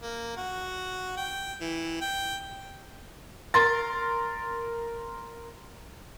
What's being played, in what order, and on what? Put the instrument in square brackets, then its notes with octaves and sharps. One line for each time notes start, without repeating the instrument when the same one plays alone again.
[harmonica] A#3
F#4
G5
E3
G5
[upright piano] A#4 C6 A6